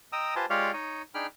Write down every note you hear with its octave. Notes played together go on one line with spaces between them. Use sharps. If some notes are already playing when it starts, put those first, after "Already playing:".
D#5 G5 A#5 D#6 E6
F4 G4 B4 C5 G#5 A5
G#3 F4 G4 C#5 D5 F5
D#4 C#5 D#5
D4 D#4 G#4 G5 B5 F6